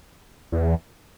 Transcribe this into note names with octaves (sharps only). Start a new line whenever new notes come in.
E2